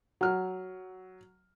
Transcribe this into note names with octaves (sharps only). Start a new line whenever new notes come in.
F#3 F6